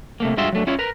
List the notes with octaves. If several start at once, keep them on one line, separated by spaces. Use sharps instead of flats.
C3 A3 A#3
G2 G#3 F4 F#4 E5 C6
F#3 A3 D4
C#4 E4 F4 C#5
A#4 B4 A#5